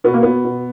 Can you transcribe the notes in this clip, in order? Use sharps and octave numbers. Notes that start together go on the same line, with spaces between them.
B2 B3
A#3
B2 B3
B2